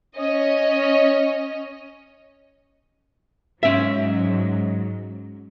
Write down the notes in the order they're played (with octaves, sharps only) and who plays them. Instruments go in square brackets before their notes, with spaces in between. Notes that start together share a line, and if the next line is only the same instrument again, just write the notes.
[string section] C#4 D#5
[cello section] G#2 F#3 [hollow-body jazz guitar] C#4 E5